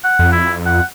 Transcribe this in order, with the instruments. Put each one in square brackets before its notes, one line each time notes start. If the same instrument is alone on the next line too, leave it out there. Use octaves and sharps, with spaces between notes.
[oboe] F#5
[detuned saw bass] F2
[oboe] E4
F#5